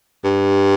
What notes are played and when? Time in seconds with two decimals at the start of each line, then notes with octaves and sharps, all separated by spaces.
0.24 G2